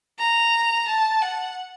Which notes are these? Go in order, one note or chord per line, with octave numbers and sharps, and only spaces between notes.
A#5
A5
F#5